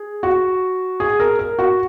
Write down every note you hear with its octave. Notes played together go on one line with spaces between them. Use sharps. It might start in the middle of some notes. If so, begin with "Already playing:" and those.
Already playing: G#4
F#4
G#4
A#4
A#4
F#4